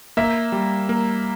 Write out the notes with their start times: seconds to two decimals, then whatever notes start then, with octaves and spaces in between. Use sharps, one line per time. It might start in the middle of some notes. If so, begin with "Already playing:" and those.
0.17 A#3 E5
0.52 G3
0.89 A#3